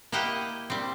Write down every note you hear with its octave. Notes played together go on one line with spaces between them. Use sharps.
A#3 E4 G4 D#5 F#5 G5
G3 C4